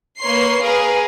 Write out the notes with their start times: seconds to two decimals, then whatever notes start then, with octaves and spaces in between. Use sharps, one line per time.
0.21 A#3 B4 C#5 C6 C7
0.62 G#4 A#4 B4 F5